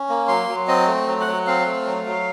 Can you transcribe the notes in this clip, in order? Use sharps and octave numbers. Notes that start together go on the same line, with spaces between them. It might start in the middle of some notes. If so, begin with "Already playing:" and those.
Already playing: C#4
A#3
F#3 C6
F#3
C4 D#5
A3
F#3
F#5
F#3
C4 F5
A3
F#3
F#3